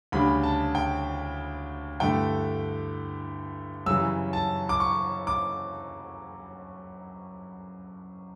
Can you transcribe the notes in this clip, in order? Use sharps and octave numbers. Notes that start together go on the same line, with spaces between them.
D2 C#3 G3 D4 B5
A5
G5
G2 D3 A3 E4 G5
F#2 C#3 E3 G3 E6
A5
D6
C#6
D6